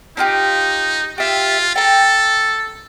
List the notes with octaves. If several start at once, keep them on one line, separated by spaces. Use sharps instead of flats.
D4 D#4 F4 G4
F4 G4 E5
A4 G5 A#5